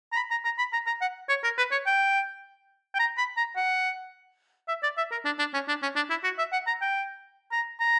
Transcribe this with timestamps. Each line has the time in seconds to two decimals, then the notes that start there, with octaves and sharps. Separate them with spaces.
0.12 A#5
0.16 B5
0.31 A#5
0.45 A#5
0.58 B5
0.73 A#5
0.87 A#5
1.01 F#5
1.29 C#5
1.44 A#4
1.58 B4
1.71 C#5
1.86 G5
2.94 G5
2.99 A#5
3.18 B5
3.37 A#5
3.56 F#5
4.68 E5
4.83 D5
4.97 E5
5.11 A#4
5.25 D4
5.39 D4
5.54 C#4
5.68 D4
5.82 C#4
5.96 D4
6.10 E4
6.24 F#4
6.38 E5
6.52 F#5
6.67 A#5
6.81 G5
7.52 A#5
7.80 A#5